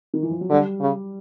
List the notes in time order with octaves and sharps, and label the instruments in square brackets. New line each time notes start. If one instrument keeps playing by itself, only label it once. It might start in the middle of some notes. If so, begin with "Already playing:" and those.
[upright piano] D#3
E3
F3
F#3
[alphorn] D3 [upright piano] G3
[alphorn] C#3